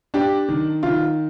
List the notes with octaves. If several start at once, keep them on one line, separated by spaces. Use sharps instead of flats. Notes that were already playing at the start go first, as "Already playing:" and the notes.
D4 G4
D#3
D#3 F4